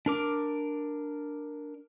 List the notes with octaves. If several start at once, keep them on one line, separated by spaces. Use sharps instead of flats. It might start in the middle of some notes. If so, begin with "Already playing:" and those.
D4 A#4 D6